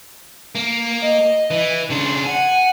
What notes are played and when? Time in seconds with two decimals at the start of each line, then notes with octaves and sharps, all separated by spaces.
0.55 A#3
1.00 D#5
1.51 E3
1.90 C#3 D4 C6
2.25 F#5 G#5